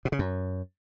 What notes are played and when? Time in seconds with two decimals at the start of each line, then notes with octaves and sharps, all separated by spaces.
0.05 B2
0.12 C#3
0.19 F#2